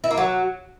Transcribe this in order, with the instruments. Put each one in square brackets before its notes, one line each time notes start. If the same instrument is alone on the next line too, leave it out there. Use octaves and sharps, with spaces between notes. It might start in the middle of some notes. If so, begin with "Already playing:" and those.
[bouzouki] E4
A#3
F#3